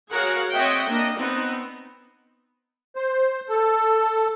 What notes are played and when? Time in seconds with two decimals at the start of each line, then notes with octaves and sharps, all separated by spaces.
0.12 F#4 G#4 A#4 C#5 F5 F#5
0.54 C4 C#5 D#5 E5 F#5 G5
0.88 A#3 D4 D#5
1.17 B3 C4 D#4
2.96 C5
3.49 A4